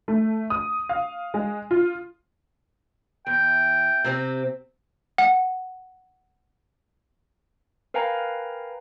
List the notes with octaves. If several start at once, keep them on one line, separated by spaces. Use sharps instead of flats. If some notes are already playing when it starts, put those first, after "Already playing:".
A3
D#6
F5
G#3
F4
E2 G5
C3 C4 G4
F#5
A#4 B4 F5 G5 G#5 A#5